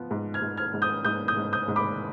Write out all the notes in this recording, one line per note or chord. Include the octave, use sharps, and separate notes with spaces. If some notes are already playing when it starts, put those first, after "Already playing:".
Already playing: F3 B3
G#2
F6 G#6
G#2
F6 G#6
G#2
D#6 G6
G#2 D#6 G6
D#6 G6
G#2
D#6 G6
G#2
B5 D6